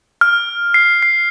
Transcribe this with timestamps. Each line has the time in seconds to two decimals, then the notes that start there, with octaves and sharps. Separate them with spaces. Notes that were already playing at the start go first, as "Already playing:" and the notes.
0.21 F6
0.74 C7
1.02 C7